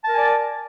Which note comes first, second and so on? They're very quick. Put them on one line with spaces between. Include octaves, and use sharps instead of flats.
A5 A#4 G#5 D5